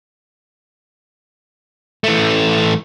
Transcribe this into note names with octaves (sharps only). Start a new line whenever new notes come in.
E3 A3